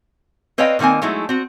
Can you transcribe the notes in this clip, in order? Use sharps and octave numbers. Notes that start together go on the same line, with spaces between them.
C4 B4 C#5 D#5 F5 G5
A2 D#3 A#3 C4 G#5
F#3 G#3 A3 D#4 E4
C4 F#4